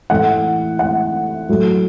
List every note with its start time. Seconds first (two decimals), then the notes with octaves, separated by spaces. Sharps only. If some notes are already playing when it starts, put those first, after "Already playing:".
0.10 A2 E3 A3 F#5
0.79 F#5
1.49 A2 F#3 A3